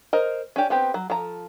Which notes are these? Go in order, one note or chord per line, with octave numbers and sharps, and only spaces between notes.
A#4 C5 D#5
C#4 D4 G4
B3 C4 G4
F#3
F3 A4 A#5